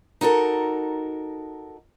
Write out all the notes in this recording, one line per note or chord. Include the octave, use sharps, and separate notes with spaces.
D#4 F#4 A4 A#4